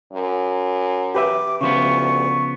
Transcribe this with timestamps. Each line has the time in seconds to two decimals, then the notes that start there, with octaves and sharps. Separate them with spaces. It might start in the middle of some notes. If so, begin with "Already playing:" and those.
0.13 F#2
1.15 G4 B4 E5 D6
1.61 D2 C#3 F3 B3 C#6